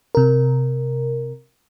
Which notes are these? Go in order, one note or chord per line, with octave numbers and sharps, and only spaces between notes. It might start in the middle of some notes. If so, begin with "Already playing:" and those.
C3 A#4